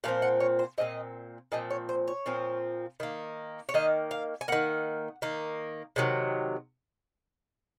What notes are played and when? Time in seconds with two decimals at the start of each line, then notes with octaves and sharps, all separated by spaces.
0.04 A#2 F3 C4 F5
0.22 F#5
0.40 C#5
0.59 C5
0.78 A#2 F3 C4 D#5
1.52 A#2 F3 C4 D#5
1.70 C#5
1.89 C5
2.08 C#5
2.26 A#2 F3 C4
3.00 D#3 A#3
3.69 C#5
3.74 D#3 A#3 D#5
4.11 F5
4.41 G#5
4.48 D#3 A#3 F#5
5.22 D#3 A#3
5.96 C3 D#3 F#3